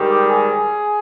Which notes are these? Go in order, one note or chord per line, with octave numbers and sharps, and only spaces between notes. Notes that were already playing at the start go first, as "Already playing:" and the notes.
Already playing: G#2 D#3 G3 G4
G#4